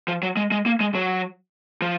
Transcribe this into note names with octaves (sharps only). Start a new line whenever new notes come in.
F3
F#3
G#3
G#3
A#3
G#3
F#3
F3